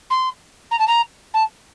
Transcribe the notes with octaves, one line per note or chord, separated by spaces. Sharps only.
C6
A#5
A5
A#5
A5